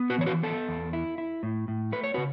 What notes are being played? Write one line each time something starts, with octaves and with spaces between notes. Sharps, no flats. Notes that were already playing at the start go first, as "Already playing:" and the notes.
Already playing: B3
F#4 B4
E3 C#5
F#4 B4
B3 A4
E2
E4
E4
A2
A2
A3 B4
C#5
C#3 F#4 B4